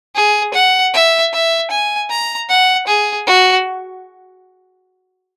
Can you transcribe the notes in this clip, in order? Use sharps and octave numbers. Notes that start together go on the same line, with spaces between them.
G#4
F#5
E5
E5
G#5
A#5
F#5
G#4
F#4